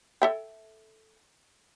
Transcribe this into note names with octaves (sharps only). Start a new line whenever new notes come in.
A4 E5 G5